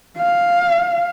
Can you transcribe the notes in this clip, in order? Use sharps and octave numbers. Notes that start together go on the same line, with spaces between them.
F5